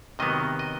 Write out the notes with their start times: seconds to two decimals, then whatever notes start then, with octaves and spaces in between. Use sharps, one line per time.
0.19 C3 D#3 F#3 B3 D#5
0.59 D#5